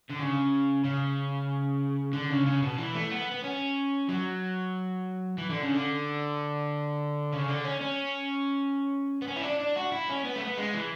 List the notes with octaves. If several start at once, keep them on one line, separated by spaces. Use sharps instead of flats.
D3
C#3
C#3
D3
C#3
C#3
B2
E3
A3
B3
B3
C#4
F#3
E3
D3
C#3
D3
C#3
D3
C#4
C#4
B3
C#4
E4
D4
D4
F#4
E4
C#4
B3
A3
B3
G#3
E3